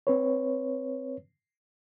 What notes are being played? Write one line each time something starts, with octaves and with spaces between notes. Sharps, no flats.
C4 B4 C#5